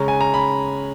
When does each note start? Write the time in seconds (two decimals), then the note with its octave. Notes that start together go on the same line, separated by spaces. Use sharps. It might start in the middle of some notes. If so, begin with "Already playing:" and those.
Already playing: C#3 G#3 C#4 A#5
0.08 G#5
0.21 A#5
0.34 B5